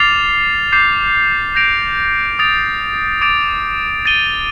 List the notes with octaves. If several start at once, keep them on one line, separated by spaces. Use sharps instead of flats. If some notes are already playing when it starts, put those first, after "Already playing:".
Already playing: D6 F6 A6 C7 F7
D6 G6 C7
G6 A#6 D7 F7
D#6 A6 D7 F7
D6 A6 D7 F7
A6 D#7 G7